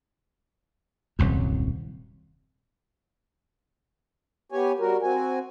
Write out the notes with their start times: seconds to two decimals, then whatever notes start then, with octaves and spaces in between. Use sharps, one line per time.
1.19 D#1 C2 F#2
4.52 B3 G4 C#5 G#5
4.79 G3 F#4 A#4
5.02 C4 F#4 G#5